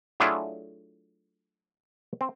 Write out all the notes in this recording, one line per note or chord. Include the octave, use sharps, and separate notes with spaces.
F#3 A3 D4 E4 F4 G#4
C4